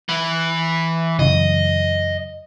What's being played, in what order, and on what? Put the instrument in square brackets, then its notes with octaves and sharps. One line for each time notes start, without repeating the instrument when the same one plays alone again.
[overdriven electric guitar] E3
[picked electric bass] F#2 C#3 E3 [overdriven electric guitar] D#5